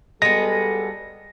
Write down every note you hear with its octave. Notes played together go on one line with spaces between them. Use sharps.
G3 G#3 B3 F#4 A4 A#6